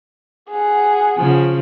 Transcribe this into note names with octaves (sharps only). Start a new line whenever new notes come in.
G#4 F#5
C#3 F3